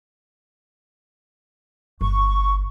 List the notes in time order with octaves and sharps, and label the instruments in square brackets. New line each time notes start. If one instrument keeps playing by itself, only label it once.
[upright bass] G1 [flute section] C#6